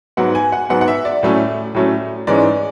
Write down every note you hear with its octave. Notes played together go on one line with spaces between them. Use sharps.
G#2 F#3 B3 F#5
G#5
F#5
G#2 F#3 B3 F#5
F#5
E5
D5
A2 F#3 A3 C#4
A2 F#3 A3 C#4
G#2 E3 G#3 C#4 D5